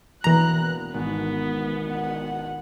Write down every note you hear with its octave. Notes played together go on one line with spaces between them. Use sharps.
E1 E3 A#3 B3 A#5 F#6
G#1 B3
F#5